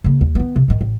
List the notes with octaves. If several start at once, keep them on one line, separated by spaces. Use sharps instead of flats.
C#3 A#3
D#2
D#3 B3
C3
G#2 D#3
A1